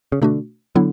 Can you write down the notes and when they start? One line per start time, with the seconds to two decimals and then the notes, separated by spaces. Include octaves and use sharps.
0.12 C#3
0.22 B2 D3 A3 D4 F#4
0.75 D3 F#3 B3 E4